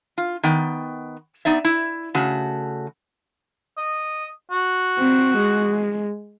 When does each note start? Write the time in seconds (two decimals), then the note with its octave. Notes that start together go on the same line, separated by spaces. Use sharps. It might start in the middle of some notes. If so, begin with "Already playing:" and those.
0.18 F4
0.43 D#3 B3 G5
1.45 B3 D#4 D5 E5
1.64 E4
2.15 C#3 A3 F#4
3.78 D#5
4.51 F#4
4.98 C4
5.37 G#3